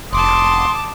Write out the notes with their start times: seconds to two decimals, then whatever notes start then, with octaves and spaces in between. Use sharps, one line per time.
0.13 F1 A5 C6 D6 D#6